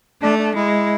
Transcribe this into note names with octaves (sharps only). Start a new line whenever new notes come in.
A3 D4
D4
G#3 E4